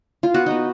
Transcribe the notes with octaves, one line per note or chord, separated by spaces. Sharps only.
F4
B3 F#4
B3 D#4